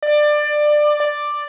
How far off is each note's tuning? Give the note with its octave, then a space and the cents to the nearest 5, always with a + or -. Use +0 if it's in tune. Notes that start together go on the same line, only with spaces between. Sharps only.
D5 +20
D5 +5